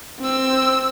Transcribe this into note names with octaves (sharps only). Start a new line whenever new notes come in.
C4 E6